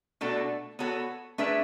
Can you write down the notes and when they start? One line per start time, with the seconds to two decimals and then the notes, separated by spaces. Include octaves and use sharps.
0.21 B2 A3 D4 F#4 A4
0.79 B3 F#4 A4 C#5
1.38 A3 D4 G#4 B4 E5